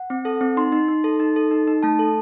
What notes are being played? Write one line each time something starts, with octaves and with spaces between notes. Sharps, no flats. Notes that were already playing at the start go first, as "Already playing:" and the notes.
Already playing: F#5
C4
A4
C4
D#4 C6
D#4
D#4
A4
D#4
A4
D#4
D#4
A3 A5
A4